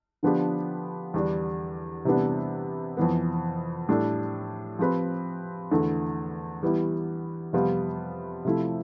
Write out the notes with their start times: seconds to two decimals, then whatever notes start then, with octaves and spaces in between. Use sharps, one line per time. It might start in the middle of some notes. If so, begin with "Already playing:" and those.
0.23 D3 F3 B3 D4 G4
1.14 E2 D3 G3 D4
2.05 C3 E3 G3 B3 D4
2.97 F2 E3 B3
3.88 A2 G3 D4 A4
4.79 F3 C4 G4 B4
5.71 E2 D3 A3 E4
6.63 E3 G3 B3 E4
7.53 F2 C3 G3 B3 F4
8.45 C3 F3 A3 E4